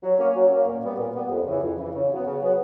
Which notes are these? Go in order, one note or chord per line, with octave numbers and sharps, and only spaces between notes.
F#3
A#3 C#4
F#3
A#3 C#4
A#2
G3 B3
A#2
G3 B3
F2
C#3 E3
F2
C#3 E3
C#3
F#3 B3
C#3
F#3 B3